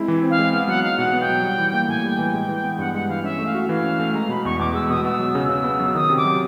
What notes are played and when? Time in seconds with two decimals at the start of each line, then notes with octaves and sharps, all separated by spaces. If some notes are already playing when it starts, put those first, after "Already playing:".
Already playing: G#3 C4 E4
0.08 E3
0.23 C4
0.30 F5
0.39 G#3
0.53 B3 F5
0.68 F#3 F#5
0.83 D#4 F5
0.98 B2 F#5
1.13 B3
1.21 G5
1.29 F#3
1.43 G3
1.58 E3
1.73 A#3
1.89 A2 G#5
2.04 G3
2.11 G5
2.19 E3
2.34 G#3
2.49 E3
2.64 B3
2.79 G2 F#5
2.94 G#3 F#5
3.09 E3 F5
3.24 C#4 E5
3.39 A3
3.46 F5
3.55 F#4
3.69 E3 F5
3.84 C#4
4.00 A3
4.14 G#3 A#5
4.29 B2 B5
4.45 E2 C#6
4.59 E2 D6
4.74 G#3 E6
4.89 B2 D#6
5.04 B3 E6
5.19 F#3
5.35 C#3
5.49 C#3 E6
5.64 B3
5.80 F#3
5.95 D#3 D#6
6.10 C3
6.17 D6
6.25 F#3